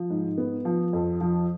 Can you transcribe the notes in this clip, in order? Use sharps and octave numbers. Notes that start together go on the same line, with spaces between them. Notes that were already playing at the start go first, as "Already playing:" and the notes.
Already playing: F3
G#2
B3
F3
F2
F3